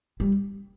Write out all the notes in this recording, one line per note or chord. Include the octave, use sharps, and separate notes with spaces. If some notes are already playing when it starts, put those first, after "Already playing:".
G3